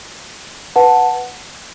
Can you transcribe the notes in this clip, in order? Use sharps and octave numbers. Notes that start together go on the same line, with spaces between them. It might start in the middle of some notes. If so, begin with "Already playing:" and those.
B4 F#5 A5